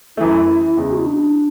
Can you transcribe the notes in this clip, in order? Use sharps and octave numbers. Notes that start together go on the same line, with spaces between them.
F#2 E3 A3 E4
E2 C#3 G#3
F#4
E4
D4